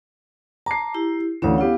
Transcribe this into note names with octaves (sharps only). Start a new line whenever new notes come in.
A5 A#5 D6 C7
E4 G4
D2 E3 C#4 C#5 F5
B3 E4 G4 F5 F#5